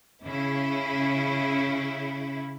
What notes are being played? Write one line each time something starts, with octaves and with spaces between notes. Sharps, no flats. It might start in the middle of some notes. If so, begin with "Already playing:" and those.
C#3 E4